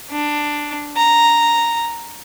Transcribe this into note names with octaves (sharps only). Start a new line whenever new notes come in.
D4
A#5